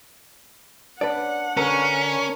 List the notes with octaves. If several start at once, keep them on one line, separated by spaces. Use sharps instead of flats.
D4 B4 D5 F#5
D3 C#4 A#4 B4